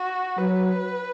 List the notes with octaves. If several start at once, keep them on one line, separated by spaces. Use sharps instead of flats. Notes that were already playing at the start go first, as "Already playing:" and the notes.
Already playing: F#4
F#3 B4